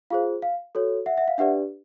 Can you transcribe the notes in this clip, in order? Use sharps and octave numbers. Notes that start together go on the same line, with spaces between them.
F4 G#4 C5 F5
F5
F#4 A4 C#5
E5 F#5
E5 F#5
F5
D4 G4 B4 D5 E5 F#5